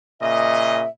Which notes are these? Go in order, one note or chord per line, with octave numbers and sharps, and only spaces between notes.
A#2 C#3 D#5 E5